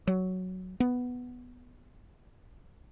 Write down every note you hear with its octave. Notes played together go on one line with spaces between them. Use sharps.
F#3
B3